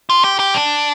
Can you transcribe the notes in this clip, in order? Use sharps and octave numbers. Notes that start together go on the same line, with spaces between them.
F4
G4
G4
D4